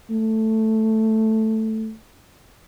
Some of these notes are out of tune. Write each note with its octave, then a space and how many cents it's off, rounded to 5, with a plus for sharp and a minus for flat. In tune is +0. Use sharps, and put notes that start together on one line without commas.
A3 +0